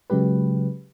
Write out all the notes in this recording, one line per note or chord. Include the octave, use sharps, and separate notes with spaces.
C#3 F#3 G#3 G4 B4